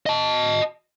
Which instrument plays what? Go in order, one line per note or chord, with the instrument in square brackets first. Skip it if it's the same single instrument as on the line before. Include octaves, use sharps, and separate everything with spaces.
[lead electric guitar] D#5 A5